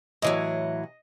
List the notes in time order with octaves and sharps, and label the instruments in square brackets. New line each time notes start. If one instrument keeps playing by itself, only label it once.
[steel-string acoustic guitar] A2 E3 F#3 [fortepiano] D#5